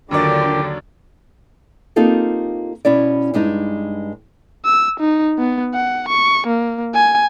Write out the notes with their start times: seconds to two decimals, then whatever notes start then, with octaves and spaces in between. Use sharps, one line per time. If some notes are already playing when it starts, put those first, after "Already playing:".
0.11 D#2 D3 F#3 D4 F4 G4 A#4 D5
1.96 A#3 C4 D#4 F4 G4 A4
2.85 B2 C#4 E4 D5
3.34 G2 G#3 D4 D#4
4.65 E6
5.00 D#4
5.39 B3
5.74 F#5
6.09 C#6
6.47 A#3
6.95 G#5